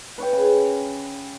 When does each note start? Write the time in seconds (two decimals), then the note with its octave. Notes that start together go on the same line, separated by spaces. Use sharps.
0.18 B4 C#5 G5
0.33 C#3